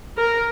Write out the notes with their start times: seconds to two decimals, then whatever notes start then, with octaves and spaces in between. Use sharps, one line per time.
0.17 A#4